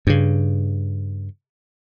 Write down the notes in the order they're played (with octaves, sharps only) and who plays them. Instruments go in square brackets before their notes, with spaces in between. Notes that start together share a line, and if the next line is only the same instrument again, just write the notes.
[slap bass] G2 C#3